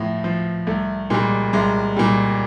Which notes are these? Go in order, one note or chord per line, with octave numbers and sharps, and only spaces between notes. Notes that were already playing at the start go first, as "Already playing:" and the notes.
Already playing: A2 F3 B3
F3
C2 A3
A#2 G3 G#3
C2 G#3
A#2 G3